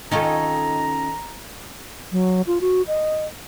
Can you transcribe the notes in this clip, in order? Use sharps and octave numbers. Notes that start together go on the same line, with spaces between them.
D#3 C#4 D#4 F4 A4 A#5
F#3
F4
F#4
D#5